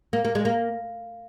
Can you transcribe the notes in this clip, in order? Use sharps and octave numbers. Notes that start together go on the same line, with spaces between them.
A#3
A#3
G#3
A#3